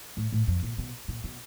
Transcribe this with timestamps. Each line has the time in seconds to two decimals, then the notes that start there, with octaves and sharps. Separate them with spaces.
0.17 A2
0.32 A2
0.47 F2
0.63 A#2
0.78 B2
1.08 A#2
1.24 B2